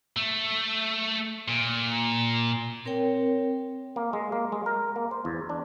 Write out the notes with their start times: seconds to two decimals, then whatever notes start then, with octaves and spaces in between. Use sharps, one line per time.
0.17 A3
1.48 A#2
2.85 C4 A#4 C#5 G5
3.96 A#3
4.13 G#3
4.32 A#3
4.52 G#3
4.66 A#4
4.96 A#3
5.11 C5
5.25 E2
5.49 D4